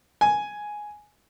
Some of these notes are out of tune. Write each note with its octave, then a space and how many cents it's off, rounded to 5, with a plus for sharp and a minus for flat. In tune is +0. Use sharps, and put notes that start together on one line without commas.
G#5 +5